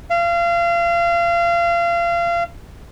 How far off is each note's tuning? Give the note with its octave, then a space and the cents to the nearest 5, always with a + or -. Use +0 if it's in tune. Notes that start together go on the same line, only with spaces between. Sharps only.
F5 -30